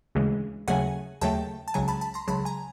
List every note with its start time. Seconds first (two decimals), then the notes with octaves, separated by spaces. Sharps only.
0.15 D2 C#3 E3 G#3
0.68 D#2 C#3 F#3 A3 F#5 G#5
1.21 D#2 C#3 F#3 A3 G5 A5
1.68 A5
1.74 C#2 C#3 F#3 G#5 A#5
1.88 A5 B5
2.01 A5 B5
2.14 A#5 C6
2.28 C#2 C#3 F#3 A5 B5
2.45 G#5 A#5